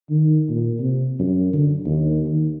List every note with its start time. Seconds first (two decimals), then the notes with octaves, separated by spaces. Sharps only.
0.10 D#3
0.49 A#2
0.80 C3
1.19 F#2
1.53 D3
1.85 D#2
2.26 D#3